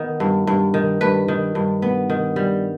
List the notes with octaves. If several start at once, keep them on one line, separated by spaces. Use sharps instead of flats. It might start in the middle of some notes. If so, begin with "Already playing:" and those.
Already playing: D#3 B3
G2
G2
D#3
G2 B4
D#3
G2
B3
D#3
G3